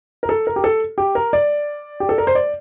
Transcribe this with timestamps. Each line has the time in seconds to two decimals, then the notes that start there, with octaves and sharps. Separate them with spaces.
0.23 A#4
0.29 A4
0.47 A#4
0.56 G4
0.64 A4
0.98 G4
1.15 A#4
1.33 D5
2.00 G4
2.09 A4
2.18 A#4
2.27 C5
2.35 D5